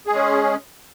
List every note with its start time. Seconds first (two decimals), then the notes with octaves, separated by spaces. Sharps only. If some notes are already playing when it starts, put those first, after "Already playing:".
0.07 G#4
0.11 G#3
0.15 C#4